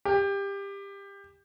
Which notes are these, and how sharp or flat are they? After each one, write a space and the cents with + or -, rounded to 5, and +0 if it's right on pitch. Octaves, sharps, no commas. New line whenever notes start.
G4 +20